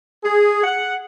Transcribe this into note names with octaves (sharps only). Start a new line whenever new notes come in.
G#4
F#5